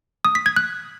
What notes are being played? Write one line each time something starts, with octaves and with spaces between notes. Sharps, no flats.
D#6
B6
G#6
F#6